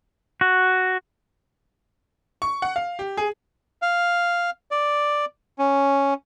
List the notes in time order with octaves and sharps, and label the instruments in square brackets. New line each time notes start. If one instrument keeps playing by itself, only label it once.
[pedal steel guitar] F#4
[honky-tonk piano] C#6
F#5
F5
G4
G#4
[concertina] F5
D5
C#4